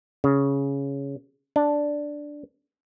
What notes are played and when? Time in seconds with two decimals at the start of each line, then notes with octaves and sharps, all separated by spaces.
0.24 C#3
1.56 D4